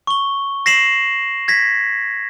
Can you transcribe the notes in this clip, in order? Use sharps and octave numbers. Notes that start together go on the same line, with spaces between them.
C#6 G7
A#6 C7 E7 F#7
G#6 A#6 B6